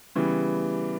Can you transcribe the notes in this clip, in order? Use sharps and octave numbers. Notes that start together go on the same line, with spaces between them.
C#3 E3 G3 B3